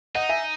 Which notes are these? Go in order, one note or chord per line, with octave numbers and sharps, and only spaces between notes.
D#4 D#5 F#5
E5 G#5